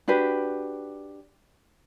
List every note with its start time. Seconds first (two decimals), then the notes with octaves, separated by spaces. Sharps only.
0.08 D4 F#4 G4 B4